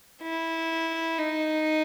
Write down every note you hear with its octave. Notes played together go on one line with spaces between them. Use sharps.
E4
D#4